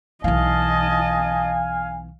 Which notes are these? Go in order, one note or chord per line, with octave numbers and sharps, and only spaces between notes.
B1 E3 D#5 F5 G#5 A5